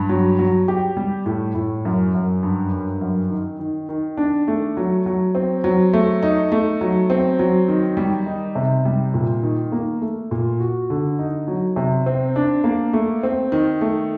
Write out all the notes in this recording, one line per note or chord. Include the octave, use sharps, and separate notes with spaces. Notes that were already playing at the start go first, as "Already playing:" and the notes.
Already playing: G2
F#3
F#3
G4
G3
A2
A2
F#2
F#2
G2
G2
F#2
D#3
D#3
D#3
D4
A3
F#3
F#3
C4
F#3
A3
D#4
A3
F#3
C4
F#3
D#3
G3
D#4
C3
G3
A#2
D#3
A#3
A3
A#2
F#4
D3
D#4
F#3
C3
C4
D4
A#3
A3
C4
D#3
A3